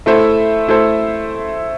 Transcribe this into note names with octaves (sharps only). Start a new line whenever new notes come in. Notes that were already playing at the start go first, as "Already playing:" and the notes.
A3 E4 A4 C5 E5
A3 E4 A4 C5 E5